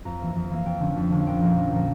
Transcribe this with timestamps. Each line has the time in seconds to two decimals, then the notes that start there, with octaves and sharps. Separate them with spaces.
0.05 F2 A#5
0.20 E3 A#3
0.35 F2
0.51 E3 A#3 F5
0.66 F2 G5
0.80 D3 F3 C#4
0.96 F2
1.12 D3 F3 C#4
1.19 F5
1.27 A#1 G5
1.42 A#2 F3 A#3
1.57 A#1
1.72 A#2 F3 A#3